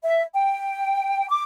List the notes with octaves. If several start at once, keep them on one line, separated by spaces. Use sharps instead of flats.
E5
G5
D6